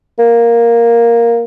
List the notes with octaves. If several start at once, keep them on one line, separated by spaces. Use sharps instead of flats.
A#3